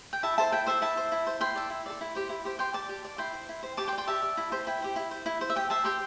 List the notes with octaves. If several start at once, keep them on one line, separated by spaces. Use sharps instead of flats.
G5
E4 E5 A5
A4 C5 E5 A5
E4 G5
A4 C5 E5
E4 E5 A5
C5
E4
C5
E4 G5 C6
A4 D5
E4
A4 D5
E4
G4 C5
E4
G4 C5
G4 G5 C6
D5 A5 D6
G4
D5
E4 G5 C6
C5
E4
C5
G4 A5 D6
G5 C6
D5
G5 C6
G4 E5 A5
D5
E4
G4 C5
E4 G5
G4 C5
E4
C5
E4
C5
E5
G4 G5
C5 E5 A5
G4 G5 C6